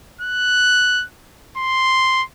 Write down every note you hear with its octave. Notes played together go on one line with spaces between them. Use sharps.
F#6
C6